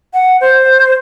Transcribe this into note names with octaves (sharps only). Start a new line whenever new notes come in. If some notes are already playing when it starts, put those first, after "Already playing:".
F#5
C5